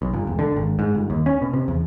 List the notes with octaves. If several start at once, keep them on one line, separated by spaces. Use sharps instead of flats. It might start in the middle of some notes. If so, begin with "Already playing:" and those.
B1
G1
E1
D3
G#1
G#2
G1
D#2
C#4
B2
C3
E2